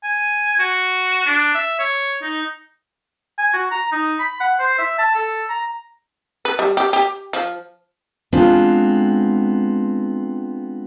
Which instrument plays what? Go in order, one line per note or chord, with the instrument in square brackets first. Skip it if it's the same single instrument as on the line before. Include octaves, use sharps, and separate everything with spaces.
[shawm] G#5
F#4
D4
E5
C#5
D#4
[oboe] G#5
F#4
A#5
D#4
B5
F#5
C5
E5
A5
A4
A#5
[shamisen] B4
G3
G4
G4
F3
[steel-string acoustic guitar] G#3 B3 C4 D4 F4